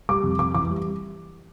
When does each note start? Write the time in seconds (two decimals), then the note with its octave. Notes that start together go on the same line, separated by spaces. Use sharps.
0.09 G3 D6
0.23 F2
0.39 F2 D6
0.54 E3 D6
0.69 G3